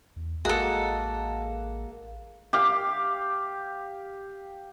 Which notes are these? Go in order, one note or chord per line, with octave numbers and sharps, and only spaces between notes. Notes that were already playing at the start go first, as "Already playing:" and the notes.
E2
A1 G#3 A#3 F#4 A4
G4 F5